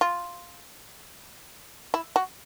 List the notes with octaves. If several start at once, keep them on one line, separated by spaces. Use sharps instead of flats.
F4
E4
F#4